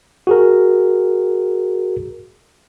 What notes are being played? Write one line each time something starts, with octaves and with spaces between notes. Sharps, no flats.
F#4 G#4 A#4